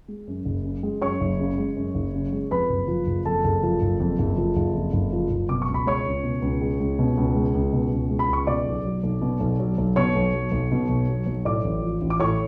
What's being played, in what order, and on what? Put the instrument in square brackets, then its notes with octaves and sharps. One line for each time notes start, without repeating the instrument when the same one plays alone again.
[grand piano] G#3
F#2
F#1
C#3
G#3
F#2 C#5 C#6
F#1
C#3
G#3
F#2
F#1
C#3
G#3
F2 B4 B5
F#1
F3
F#1
F2 A4 A5
F#1
F3
F#1
F2
F#1
F3
F#1
F2
F#1
F3
F#1
B2 D6
C#6
C#2
B5
G#3 C#5 C#6
C#2
B2
C#2
G#3
C#2
B2
C#2
G#3
C#2
B2
C#2
G#3
B5
C#2
C#6
B2 D5 D6
B1
F#3
B1
B2
B1
F#3
B1
B2 C#5 C#6
B1
F#3
B1
B2
B1
F#3
B1
A2 D5 D6
A1
F3
A1
D6
A2 C#5 C#6